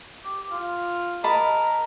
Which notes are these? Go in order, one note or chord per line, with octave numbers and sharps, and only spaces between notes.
G4
F4
A#4 D#5 A5 B5